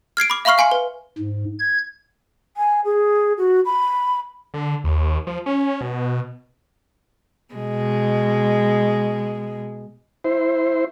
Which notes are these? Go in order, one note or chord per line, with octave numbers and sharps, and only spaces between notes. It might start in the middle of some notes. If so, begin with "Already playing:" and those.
F6 G#6 C7 D7
B5 D6
E5 F5 B5 C#6 F6 C7
F5 G#5 C6 C#7
B4
G#2
G#6
G#5
G#4
F#4
B5
D3
D#2
F3
C#4
B2
B2 G#3
E4 C5